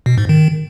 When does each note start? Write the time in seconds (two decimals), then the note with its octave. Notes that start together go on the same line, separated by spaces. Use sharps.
0.06 B2
0.18 G#2
0.29 D#3